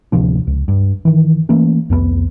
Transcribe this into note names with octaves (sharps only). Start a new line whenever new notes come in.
D1 C3 F3 D4
C#2
G2
D#3 E3
E3 A3 A#3 C#4
C2 F2 F3 B3